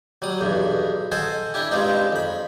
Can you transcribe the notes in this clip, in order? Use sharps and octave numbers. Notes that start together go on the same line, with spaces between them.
F#3 G3 D#6
B1 E2 G2
A4 C5 D#5 F#5 G#5
D4 E4 G4
G2 F3 G3 G#3 C4 D#4
F2 B5